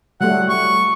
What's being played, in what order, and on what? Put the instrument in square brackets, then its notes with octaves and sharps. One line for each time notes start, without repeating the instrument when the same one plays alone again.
[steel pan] F#3 G3 A3 [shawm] F#5
[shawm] C#6